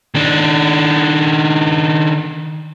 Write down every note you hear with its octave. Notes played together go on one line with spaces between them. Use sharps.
D#3 D4